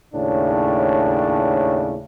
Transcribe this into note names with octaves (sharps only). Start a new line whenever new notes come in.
D#2 A2 C#3 D4